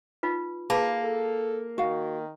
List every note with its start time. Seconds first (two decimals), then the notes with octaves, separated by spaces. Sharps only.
0.23 D#4 F4 B4
0.70 A#3 G#4 B4 A5
1.04 A4
1.78 D#3 F#4 F5